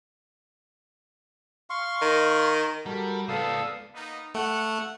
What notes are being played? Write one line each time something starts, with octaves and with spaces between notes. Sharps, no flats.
F5 C6 C#6
D#3
G3 F#4 A4 A#4
C#2 B3 A4 D5 F5 D#6 E6
A#3 B3 D#4
A3 F#5